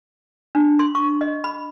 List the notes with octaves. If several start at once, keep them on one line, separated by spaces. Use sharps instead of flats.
D4
C6
C#6
D#5
B5